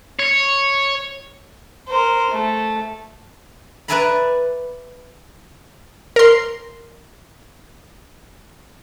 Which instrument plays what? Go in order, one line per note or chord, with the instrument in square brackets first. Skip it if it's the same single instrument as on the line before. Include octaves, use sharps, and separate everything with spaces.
[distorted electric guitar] C#5
[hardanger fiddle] A#4 C5
A3
[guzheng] B4 D5 E5 G#5 A#5 B5
[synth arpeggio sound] A#4 C6